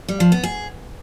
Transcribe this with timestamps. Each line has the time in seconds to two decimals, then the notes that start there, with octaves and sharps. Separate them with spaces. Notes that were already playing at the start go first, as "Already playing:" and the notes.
0.08 G3
0.20 F3
0.32 B3
0.43 G#4